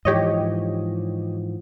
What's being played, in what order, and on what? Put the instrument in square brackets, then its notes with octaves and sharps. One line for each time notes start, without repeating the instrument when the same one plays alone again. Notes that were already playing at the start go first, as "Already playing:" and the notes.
[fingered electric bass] G#2 E3 F3 [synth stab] G4 C#5 D#5